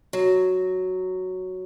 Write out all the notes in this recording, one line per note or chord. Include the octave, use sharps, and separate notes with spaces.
F#3